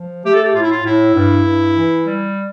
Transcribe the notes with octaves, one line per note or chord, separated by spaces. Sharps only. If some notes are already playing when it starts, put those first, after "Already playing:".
Already playing: F3
A3 G4
A4
G4
A2 F4
E4
F4
A2 E4
G2
G2
E3
G3